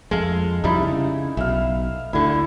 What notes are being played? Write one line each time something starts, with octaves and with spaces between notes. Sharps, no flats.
F2 G#3 A4 F5
C2 F2 G3 D#4 E4
C#3
B1 E5 F5
D2 D3 E4 A4